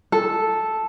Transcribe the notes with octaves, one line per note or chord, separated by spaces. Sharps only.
A4